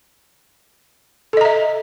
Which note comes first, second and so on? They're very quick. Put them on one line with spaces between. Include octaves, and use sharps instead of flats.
A4 D#5 A#5 E5